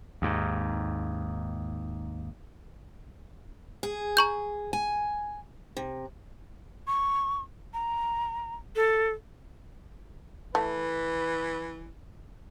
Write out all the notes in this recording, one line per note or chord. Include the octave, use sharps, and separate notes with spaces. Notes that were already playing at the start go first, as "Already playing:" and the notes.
D#2 G#2
G#4
A#5 C#6 G6
G#5
C3
C#6
A#5
A4
E3 A3 B4